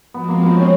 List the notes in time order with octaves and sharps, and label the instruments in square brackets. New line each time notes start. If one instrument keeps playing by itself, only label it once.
[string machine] F3 G#3 C4 [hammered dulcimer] B3
[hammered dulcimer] A#3
B3
C#4